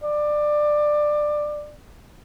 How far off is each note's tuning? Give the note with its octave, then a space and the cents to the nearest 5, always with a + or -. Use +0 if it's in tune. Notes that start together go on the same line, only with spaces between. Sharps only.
D5 +20